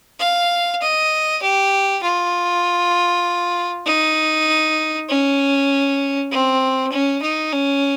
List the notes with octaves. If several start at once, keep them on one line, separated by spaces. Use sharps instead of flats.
F5
D#5
G4
F4
D#4
C#4
C4
C#4
D#4
C#4